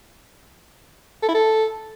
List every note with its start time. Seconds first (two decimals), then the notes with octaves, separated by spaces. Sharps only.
1.22 A4
1.29 E4
1.35 A4